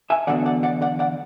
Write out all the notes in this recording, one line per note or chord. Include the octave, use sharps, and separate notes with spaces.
E5 G#5
E2 D3 F#3 B3 D5 F#5
D5 F#5
D5 F#5
D5 F#5
D5 F#5